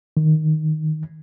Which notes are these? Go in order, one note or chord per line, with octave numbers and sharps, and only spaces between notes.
D#3